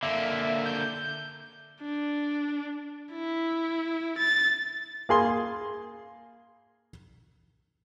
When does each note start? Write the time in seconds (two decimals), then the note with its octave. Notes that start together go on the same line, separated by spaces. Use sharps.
0.03 D3 A#3 E5
0.66 G6
1.82 D4
3.12 E4
4.18 A6
5.09 A#3 G#4 C6